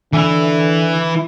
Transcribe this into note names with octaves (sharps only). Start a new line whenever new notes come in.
D3 E3 E4